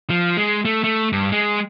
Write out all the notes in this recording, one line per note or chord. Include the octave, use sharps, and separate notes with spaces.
F3
G#3
A3
A3
G2
G#3